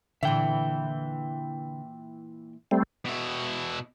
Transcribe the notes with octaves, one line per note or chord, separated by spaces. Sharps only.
A#2 D3 E3 E5 G5
G3 A3 C4
B2 E4